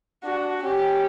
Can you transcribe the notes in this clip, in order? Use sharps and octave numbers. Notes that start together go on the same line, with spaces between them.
D4 F#4
C#4 G4